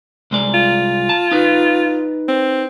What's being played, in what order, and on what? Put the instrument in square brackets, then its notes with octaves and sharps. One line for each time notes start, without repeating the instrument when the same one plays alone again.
[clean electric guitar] C2 G#3 D5
[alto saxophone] F4
[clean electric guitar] A5
D#4 B4
[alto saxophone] C4